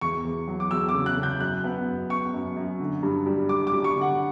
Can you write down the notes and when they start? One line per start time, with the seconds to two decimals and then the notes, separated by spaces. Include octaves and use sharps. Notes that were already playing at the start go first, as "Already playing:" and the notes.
0.01 E2 C#6
0.25 E2
0.48 F#3
0.60 D6
0.71 E2 E6
0.89 D6
0.94 C#3
1.06 F#6
1.17 C#3
1.23 G6
1.40 F#2 F#6
1.64 B3
1.87 F#2
2.10 B3 C#6
2.34 F#2
2.57 F#2
2.80 D3
3.03 G2
3.26 G3
3.49 G2 D6
3.67 D6
3.72 G3
3.84 C#6
3.96 D3
4.01 F#5